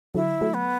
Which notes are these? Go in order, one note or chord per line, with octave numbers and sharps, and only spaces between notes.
D3 F#3 E4
F#3 A3
B3